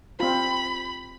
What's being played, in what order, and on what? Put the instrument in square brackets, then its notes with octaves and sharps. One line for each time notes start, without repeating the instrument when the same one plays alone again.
[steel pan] C4 F4 [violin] B5